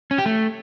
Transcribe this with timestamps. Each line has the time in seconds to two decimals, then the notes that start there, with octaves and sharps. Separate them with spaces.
0.11 C#4
0.18 G4
0.26 A3